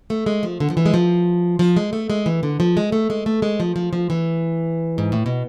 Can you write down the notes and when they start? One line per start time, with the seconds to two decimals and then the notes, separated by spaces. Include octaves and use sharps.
0.10 A3
0.26 G#3
0.43 F3
0.60 D3
0.70 F3
0.77 E3
0.86 G#3
0.94 F3
1.59 F3
1.77 G#3
1.93 A3
2.10 G#3
2.26 E3
2.43 D3
2.60 F3
2.77 G#3
2.92 A3
3.10 G#3
3.26 A3
3.42 G#3
3.60 F3
3.76 F3
3.93 F3
4.10 E3
4.98 G#2
5.12 A2
5.26 B2